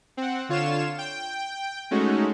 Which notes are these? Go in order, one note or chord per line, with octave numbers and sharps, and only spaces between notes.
C4 F#5
D3 F4 C#5 F5 E7
G5
G#3 A3 C#4 D#4 F#4